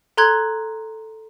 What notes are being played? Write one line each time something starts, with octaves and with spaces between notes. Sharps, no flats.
A4 A#5 C6 F#6 G#6